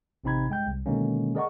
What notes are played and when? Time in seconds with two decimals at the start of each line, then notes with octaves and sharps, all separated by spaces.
0.24 A1 C3 C4 D#4 B5 G#6
0.49 G2 G#3 G5 G6
0.67 C2
0.86 B2 D3 D#3 G#3 A#3 C#4
1.35 G#4 A#4 D5 D#5 F#5 C#6